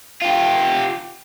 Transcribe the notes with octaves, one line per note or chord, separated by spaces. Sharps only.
F4 G4